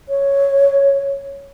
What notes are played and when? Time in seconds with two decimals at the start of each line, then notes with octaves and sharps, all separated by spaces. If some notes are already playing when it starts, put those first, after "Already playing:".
0.09 C#5